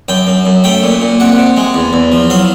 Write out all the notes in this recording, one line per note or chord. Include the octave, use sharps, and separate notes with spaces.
F#2 G5
F#2
F#2
A3 G5
A#2
A#2
C3 F#5
C3
G#3
E2
E2
F3
F#3 F5